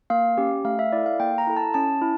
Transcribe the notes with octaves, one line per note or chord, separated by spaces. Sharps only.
A#3 F5
C#4 G4
A3 F5
E5
E4 A4 D5
F5
A#3 G5
A#5
E4 A4
A5
C#4 A5
E4